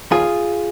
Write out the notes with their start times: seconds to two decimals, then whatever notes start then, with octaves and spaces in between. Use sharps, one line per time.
0.12 D#2 F4 G#4